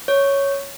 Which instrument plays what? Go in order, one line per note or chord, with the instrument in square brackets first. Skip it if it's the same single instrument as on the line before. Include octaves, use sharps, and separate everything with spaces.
[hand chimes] C#5